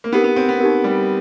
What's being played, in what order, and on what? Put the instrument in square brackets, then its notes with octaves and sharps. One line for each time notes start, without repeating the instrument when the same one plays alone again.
[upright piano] A#3
[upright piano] B3 [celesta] D#4 G4 A#4
[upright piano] B3
C4
B3
[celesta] D#4 G4 A#4
[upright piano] G3